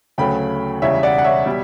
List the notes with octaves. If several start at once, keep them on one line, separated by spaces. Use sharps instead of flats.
D2 C#3 F#3 A3 G5 B5
E1 E2 C#3 G3 C#5 E5
D5 F#5
F#5
C#5 E5
B2 G3